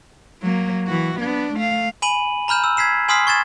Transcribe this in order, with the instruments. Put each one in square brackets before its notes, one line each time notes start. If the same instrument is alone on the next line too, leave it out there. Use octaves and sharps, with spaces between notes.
[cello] F#3 A#3
E3 F#4
B3 D4
A3 F5
[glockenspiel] G#5 B5 D#7 F#7
A#5 B5 F6 G6 E7
E6
G#6 B6 C7 E7
G#5 C6 D#6 F6 B6 C7
C#6 G#6 A6 E7